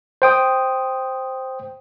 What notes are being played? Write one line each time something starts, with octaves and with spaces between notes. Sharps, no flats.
C5 G5 D#6